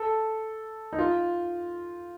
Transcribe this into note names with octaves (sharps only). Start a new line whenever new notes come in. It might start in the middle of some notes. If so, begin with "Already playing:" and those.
Already playing: A4
D#4
F4